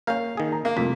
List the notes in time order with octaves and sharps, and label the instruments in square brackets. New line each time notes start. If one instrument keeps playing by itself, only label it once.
[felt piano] A#3 G6 [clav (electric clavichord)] C#4 A#4 [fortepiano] F5
[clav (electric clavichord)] D#3 G#4
[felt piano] A#5
[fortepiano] A#3
[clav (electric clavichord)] C2 F2 [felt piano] C3 A3 B6